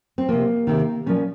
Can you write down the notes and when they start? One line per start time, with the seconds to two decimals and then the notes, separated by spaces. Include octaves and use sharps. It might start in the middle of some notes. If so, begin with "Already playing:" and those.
0.18 C4
0.29 C3 F3 A#3
0.67 C3 D#3
1.06 A#2 F3 C#4